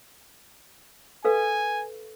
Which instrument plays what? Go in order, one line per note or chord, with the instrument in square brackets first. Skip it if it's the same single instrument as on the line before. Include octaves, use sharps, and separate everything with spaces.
[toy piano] A4 B4 F5 [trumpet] G#5